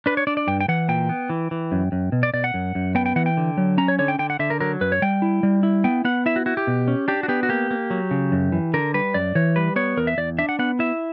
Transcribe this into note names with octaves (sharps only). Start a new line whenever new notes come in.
D4 B4
C#5
D4 D5
D5
G2 G5
G5
E3 F#5
A#2 G5
B3
E3
E3
F#2
F#2
B2
D5
B2 D5
F#5
F#2
F#2
B3 G5
G5
E3 F#5
G5
D3
F#3
C#4 A#5
C#5
D3 C#5
G5
D3 G5
F#5
D3 E5
A#4
F#3 A#4
F#2 B4
C#5
G3 G5
E4
G3
E4
B3 G5
B3 F#5
E4 E5
F#4
E4 F#4
G4
B2
C#4
D4 G4
F#4
B3 G4
F#4
A#3 G4
A#3
F#3
C#3
F#2
E3
D3 A#4
G3 B4
F#2 D5
E3 C#5
G3 B4
B3 C#5
E2 A#4
E5
E2 D5
D4 E5
F#5
B3 F#5
E4 E5